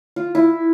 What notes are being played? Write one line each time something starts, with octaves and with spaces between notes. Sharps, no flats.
F4
E4